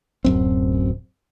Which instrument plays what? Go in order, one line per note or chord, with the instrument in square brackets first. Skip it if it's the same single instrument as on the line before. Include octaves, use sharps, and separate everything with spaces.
[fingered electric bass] D1 F#2 C4